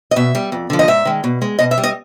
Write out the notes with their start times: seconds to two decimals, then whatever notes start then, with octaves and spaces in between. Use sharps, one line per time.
0.11 D#5
0.16 B2 E5
0.35 G3
0.52 F2
0.70 D3 F3
0.79 D#5
0.88 G#2 E5
1.05 D#3 G#3
1.24 B2
1.42 G#3
1.59 B2 D#5
1.71 E5
1.78 G3
1.84 D#5